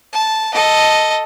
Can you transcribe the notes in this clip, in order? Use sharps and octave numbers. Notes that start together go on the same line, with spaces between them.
A5
A4 D#5